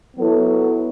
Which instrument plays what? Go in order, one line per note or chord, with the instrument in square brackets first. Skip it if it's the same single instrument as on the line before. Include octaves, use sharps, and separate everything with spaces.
[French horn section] F#3 B3 E4 A4